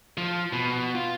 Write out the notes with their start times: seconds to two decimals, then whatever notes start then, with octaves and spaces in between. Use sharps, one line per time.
0.17 F3
0.53 B2
0.95 F4